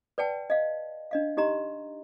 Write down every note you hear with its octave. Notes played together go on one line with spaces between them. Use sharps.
B4 D5 F#5 G5 A5
D#5 F5
D4 D#5 F5
D#4 G4 D#5 A#5 C6